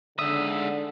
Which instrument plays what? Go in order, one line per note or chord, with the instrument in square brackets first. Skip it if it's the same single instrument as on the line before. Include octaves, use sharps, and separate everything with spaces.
[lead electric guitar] G#2 E5 [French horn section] D3 [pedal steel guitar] D#6